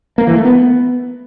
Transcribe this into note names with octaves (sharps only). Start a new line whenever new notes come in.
A#3
E3
A3
B3